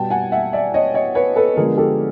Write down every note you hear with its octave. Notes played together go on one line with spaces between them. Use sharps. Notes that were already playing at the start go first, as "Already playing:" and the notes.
Already playing: B2 G3 B3 G5 A5
F#5 G#5
E5 F#5
D5 E5
C#5 D#5
C#5 D#5
B4 C#5
A4 B4
D3 F3 G#3 B3 G#4 A#4
G4 A4